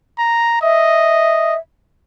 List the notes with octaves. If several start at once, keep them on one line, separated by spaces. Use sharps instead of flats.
A#5
D#5 E5